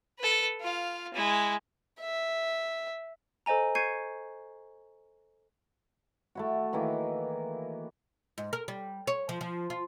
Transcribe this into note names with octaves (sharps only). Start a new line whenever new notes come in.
A4 B4
F4 F5
G#3 E4
E5
A4 C5 D#5 G#5 A#5
C#6 G6 G#6 C7 C#7 D#7
A3 E4 F#4
D#3 E3 A#3 E4
G#2
A#4
G3
C#5
F3
F3
F4